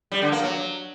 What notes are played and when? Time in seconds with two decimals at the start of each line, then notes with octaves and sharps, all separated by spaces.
0.12 G3
0.22 D3
0.32 A#3
0.42 F#3